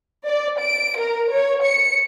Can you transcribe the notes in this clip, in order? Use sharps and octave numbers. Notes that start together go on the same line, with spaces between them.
D5
D7
A#4
C#5
C#7